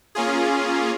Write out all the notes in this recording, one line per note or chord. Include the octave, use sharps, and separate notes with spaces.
A#3 C#4 F4 G#4